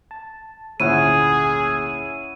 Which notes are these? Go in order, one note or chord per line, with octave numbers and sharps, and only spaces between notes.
A5
G#1 D2 A#2 C#4 E4 G#4 F#5 D#7